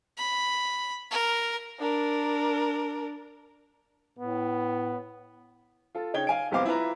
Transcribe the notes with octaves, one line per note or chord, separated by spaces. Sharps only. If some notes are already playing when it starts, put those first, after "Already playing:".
B5
A#4
D4 A#4
A2 B3
F4 A4
C#3 D#4 C#5 G5 G#6 G7
F5 G#5 D7
F1 C2 B3 C5 F5 D6
E4 F4 B4 A#5